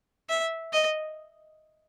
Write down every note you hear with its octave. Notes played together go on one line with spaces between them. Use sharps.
E5
D#5